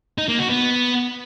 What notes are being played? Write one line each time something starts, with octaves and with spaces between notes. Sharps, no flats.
D#4
A#3
F#4
B3